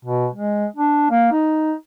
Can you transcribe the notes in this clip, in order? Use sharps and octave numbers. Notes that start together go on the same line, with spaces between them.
B2
G#3
D4
A#3
D#4